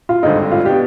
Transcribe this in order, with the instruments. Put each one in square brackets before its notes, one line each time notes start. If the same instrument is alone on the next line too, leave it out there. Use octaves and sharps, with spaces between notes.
[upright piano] F4
[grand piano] G#1 G2 D3 G#3 C4 [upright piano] D#4
[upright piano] F4
[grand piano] B2 B3 D4 [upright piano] G4